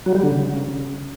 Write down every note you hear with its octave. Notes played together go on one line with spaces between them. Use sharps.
F#3
G3
D3
C#3